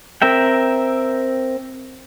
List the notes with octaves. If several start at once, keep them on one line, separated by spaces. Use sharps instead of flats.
C4 A#4 E5 G5